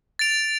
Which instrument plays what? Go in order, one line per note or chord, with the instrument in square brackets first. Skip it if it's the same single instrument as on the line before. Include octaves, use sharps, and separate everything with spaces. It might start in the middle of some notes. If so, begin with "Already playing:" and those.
[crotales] A6 D7 F7